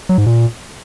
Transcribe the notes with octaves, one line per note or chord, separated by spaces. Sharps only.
F#3
G#2
A#2